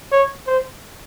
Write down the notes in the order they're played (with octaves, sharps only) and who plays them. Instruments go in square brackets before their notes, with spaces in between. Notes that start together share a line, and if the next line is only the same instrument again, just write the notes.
[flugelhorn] C#5
C5